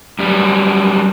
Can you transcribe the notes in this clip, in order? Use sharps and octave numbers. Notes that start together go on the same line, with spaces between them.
F#2 G3